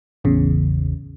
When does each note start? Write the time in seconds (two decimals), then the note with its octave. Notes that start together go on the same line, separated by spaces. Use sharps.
0.24 A1 E2 C#3